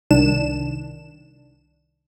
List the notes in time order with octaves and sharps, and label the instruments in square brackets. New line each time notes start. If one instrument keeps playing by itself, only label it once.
[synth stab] C2 D#3 D4 E7